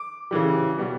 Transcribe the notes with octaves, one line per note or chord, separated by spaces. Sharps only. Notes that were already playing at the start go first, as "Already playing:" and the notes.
Already playing: D6
C#3 E3 G3
B2 G3